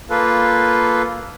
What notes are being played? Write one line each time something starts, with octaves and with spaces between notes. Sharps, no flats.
A#3 F4 A4 B4